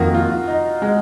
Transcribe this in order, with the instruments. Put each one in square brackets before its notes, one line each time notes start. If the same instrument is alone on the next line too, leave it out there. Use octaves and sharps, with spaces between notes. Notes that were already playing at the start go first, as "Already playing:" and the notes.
Already playing: [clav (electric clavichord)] F2 D#3 A#3 [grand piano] F#4
[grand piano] F4
D#4
G#3